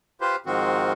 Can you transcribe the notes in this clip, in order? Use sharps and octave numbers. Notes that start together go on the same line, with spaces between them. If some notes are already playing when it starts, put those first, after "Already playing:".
F4 G4 B4 C5
G#2 D#3 F3 C4 F#4